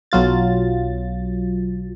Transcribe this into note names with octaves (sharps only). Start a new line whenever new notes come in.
B1 F#3 F4 A6